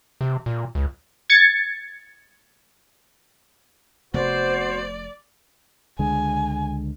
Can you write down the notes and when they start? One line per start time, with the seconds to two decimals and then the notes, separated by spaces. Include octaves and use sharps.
0.21 C3
0.46 A#2
0.75 C#2
1.30 G#6 A6 C#7
4.14 F1 C3 A3 B3 F#4 C5 D5
5.99 C#2 D3 G#3 G#5